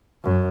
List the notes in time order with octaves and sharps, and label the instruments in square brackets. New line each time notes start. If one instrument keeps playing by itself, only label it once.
[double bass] F#2